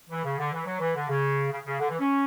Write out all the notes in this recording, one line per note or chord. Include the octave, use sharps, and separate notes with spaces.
E3
C#3
D3
E3
F#3
E3
D3
C#3
C#3
C#3
D3
E3
C#4